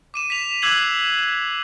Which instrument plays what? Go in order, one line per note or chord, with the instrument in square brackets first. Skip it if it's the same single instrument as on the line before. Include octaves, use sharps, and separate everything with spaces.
[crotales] D6 D#7 E7
B6 F7
D6 E6 F#6 G#6 C7 F#7